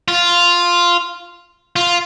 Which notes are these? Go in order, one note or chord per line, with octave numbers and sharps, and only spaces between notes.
F4
F4